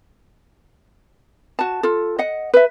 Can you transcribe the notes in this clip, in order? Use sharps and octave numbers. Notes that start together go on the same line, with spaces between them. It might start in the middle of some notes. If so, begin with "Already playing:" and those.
F#4 A5
F4 A4
D#5 F#5
B4 E5